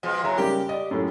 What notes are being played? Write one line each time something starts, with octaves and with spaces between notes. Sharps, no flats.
B2 F3 G#3
A2 C#3 F#3 E5 A#5
C#3 G3 G4 A#4
D5 D#5
F#2 A2